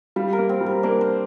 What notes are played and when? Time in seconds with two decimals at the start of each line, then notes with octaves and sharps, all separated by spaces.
0.16 G3 F5
0.33 A#4
0.39 A#3
0.49 C4
0.61 G3
0.66 A#4
0.83 A#3 D4
1.01 C5